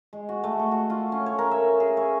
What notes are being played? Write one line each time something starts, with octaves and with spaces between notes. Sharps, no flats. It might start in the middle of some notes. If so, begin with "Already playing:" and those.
G#3
F#4
A3
A4
F#4
F4
C#4
C#5
A#4
E5
G#4
C#5